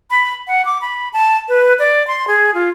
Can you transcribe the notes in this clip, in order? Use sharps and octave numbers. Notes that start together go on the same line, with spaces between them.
B5
F#5
D6
B5
A5
B4
D5
C6
G#4
F4